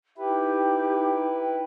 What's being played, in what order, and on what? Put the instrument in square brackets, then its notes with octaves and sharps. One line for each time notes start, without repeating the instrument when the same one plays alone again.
[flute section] D#4 G5 [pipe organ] E4 B4 [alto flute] G4